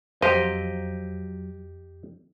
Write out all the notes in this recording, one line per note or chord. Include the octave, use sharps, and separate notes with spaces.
F2 F#3 G4 C5 D#5 F5